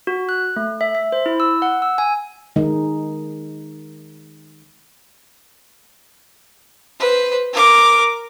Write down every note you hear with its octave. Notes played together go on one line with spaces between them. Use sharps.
F#4
F#6
A3
E5
E5
C5
E4
E6
F#5
E6
G#5
D#3 G#3 D#4
B4 C5
A#4 D6